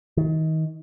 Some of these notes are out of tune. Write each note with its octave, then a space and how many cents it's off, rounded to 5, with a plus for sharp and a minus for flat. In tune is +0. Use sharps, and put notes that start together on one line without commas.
D#3 +30